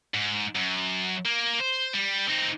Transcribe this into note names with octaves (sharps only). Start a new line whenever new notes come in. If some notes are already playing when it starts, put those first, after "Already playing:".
G#2
F#2
A#3
C5
G3
C4 D#4